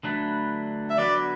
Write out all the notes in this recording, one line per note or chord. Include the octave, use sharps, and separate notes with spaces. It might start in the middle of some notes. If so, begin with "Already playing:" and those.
D3 F#3 A3 D4 B4
E5
D3 F#3 B3 F#4 B4 D5